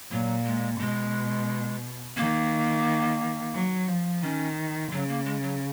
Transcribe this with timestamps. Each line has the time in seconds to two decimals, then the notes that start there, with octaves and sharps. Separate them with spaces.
0.11 A#2 F#3
0.46 G#3
0.79 B2 G#3
2.17 D#3 A#3
3.54 F#3
3.88 F3
4.22 D#3 C#4
4.91 C#3 F#3
5.09 A#3
5.25 G#3
5.43 F#3